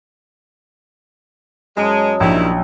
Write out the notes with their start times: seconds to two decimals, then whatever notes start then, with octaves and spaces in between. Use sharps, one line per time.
1.77 F#2 G#3 D#4 A5
2.20 A#1 D#3 G3 E4